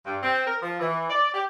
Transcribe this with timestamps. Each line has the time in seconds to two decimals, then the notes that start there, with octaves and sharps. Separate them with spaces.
0.06 G2
0.23 C4
0.47 A#4
0.63 F3
0.80 E3
1.10 D5
1.34 G4